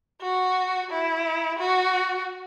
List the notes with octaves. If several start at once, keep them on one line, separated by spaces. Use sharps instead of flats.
F#4
E4
F#4